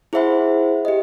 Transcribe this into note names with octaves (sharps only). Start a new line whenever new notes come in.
E4 G#4 C5 E5 F#5 B5
G4 D#5